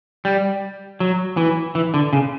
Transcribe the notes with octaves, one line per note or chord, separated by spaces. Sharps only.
G3
F#3
E3
E3
D3
C#3